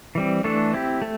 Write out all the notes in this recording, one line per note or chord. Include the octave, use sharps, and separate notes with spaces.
E3 G3 C4
E3 A3 D4 A4
C4 E4 G4
A3